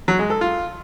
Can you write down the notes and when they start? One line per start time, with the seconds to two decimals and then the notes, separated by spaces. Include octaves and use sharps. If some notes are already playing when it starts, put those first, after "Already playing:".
0.08 F#3
0.19 G#3
0.30 A4
0.41 F4